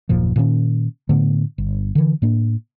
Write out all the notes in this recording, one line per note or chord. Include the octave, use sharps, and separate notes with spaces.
F#1 D#2 A#2 F3
A#2 D#3 C#4
A2 D3 A3 B3
G1
D3 E3
A2 A#3 D4